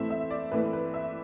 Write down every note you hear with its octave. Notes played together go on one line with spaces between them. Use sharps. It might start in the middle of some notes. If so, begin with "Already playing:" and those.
Already playing: A2 E3 A3 C4 E5
E5
D5
A2 E3 A3 C4 B4
B4
E5